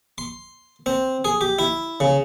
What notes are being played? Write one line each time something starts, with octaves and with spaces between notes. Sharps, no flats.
C6
C4
G#4
G4
E4
C#3